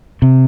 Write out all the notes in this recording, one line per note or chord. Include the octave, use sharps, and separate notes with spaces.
C3